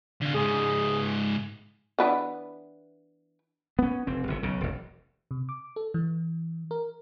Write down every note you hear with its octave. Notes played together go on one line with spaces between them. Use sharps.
D3 F5
G#2 C#3 G#4
E3 B3 D4
B3 C#4
F1 C4
G1 C3
B1 C#3
E1 A1
C3
D6
A4
E3
A#4